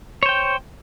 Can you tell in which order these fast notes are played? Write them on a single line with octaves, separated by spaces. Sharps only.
C#5 C5 G5